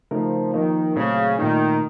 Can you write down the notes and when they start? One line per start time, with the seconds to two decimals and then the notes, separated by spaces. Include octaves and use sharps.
0.11 C#3 F3 A3 D#4 A#4
0.54 D#3 F3 A#3 D#4 A#4
0.96 A#2 C#3 F#3 A3 C4
1.39 A#2 D#3 A3 D#4